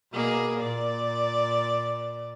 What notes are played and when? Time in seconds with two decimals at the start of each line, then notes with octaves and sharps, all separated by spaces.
0.13 B2 A#3 G#4
0.59 A#2 D5